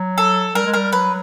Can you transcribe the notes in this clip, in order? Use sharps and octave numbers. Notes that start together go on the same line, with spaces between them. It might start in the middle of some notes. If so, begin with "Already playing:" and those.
Already playing: F#3
A4
G3 A#4
G#3
G3 A#4
F#3 B4